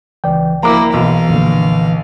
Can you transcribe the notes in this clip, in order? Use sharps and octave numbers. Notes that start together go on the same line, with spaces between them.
C#2 E3 D5 G5
F3 A#3 E4 A#5 D6
B1 E3 F5
F2 A#2 D3